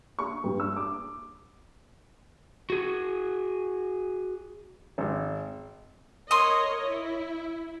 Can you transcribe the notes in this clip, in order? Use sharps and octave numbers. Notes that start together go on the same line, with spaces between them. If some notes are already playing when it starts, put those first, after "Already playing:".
C#6
G2
E6
D6
F#4 G#4
G#1
A#4 C#5 D#5 C6 D#6
E4